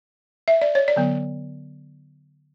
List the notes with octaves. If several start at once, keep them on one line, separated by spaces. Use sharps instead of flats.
E5
D5
C#5
D5
D3 F#3 B3